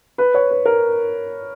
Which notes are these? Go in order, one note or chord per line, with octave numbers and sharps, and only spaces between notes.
B4
C#5
B4
A#4